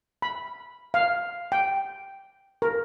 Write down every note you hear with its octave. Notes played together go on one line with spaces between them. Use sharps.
B5
F5
G5
A#4